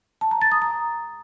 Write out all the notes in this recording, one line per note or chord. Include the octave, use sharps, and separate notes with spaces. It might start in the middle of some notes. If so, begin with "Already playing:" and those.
A5
A#5
A6
D#6
A#5